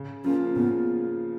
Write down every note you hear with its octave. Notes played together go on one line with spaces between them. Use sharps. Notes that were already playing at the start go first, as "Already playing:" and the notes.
Already playing: C#3
F3 A#3 C#4 F4
C#3 B3